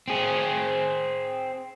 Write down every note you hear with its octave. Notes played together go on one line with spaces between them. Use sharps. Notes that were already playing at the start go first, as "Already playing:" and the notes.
C4 G#4